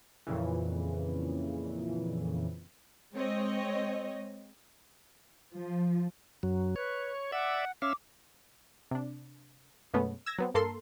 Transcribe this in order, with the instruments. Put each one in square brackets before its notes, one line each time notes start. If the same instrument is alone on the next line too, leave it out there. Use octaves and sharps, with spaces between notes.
[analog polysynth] F2 A#2 C#3 E3
[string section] G#3 C4 C#5 D#5
[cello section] F3
[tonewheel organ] F#2 F#3
[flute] B4 [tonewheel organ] C#5
[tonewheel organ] D5 E5 [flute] F#5
[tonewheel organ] C#4 E5 F5 [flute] D6
[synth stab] C3 D4
F#2 B2 G#3 A3 B3 C#4
E6 G#6 A#6
F#3 B3 C4
G2 A#3 A4 A#4 C6